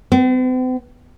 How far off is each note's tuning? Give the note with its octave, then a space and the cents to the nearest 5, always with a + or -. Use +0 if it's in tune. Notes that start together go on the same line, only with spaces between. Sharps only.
C4 -45